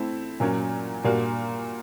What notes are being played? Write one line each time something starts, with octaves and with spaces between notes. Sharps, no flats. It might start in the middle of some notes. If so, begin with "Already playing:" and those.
Already playing: A3 C4 E4
A#2 F#3 A#3 C#4
A#2 G3 A#3 D4 F#4